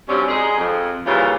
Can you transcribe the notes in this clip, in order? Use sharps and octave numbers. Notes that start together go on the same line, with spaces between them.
G2 C3 F#3 G3 C#4
G#3 D#4 G#4
F2
D#2 A#2 C#3 E3 G3 F4